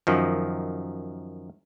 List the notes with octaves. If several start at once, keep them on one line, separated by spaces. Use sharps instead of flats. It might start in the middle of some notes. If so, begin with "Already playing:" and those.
F#2 D#3 F3